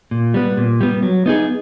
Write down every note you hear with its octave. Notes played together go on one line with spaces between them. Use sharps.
A#2
G3 B3
A#2
G3 B3
F#3
B3 D#4 G#4